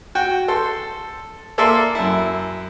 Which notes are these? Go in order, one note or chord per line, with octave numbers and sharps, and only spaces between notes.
F#4 G5
A4 C6
A#3 A4 D5 E5 C6
F#2 E4